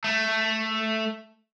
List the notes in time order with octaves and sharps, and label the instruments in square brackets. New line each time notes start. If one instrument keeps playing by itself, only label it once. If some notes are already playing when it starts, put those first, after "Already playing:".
[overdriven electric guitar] A3